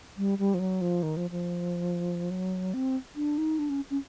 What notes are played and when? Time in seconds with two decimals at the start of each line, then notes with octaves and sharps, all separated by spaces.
0.17 G3
0.39 G3
0.54 F3
0.60 F#3
0.81 F3
1.03 D#3
1.17 F3
1.31 F3
2.31 F#3
2.74 C4
3.16 D4
3.38 D#4
3.59 D4
3.70 C#4
3.90 C#4